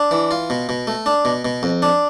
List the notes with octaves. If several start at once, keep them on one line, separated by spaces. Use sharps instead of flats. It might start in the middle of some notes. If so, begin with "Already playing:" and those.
Already playing: D4
E3
F4
B2
B2
A3
D4
B2
B2
F2
D4